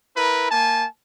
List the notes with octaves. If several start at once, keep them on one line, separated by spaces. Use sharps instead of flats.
E4 A#4 B4
A#3 G#5 A5